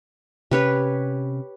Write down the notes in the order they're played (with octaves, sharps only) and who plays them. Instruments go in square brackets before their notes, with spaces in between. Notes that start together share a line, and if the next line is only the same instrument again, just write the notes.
[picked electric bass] C3 C#4 [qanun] G4 B4 C#5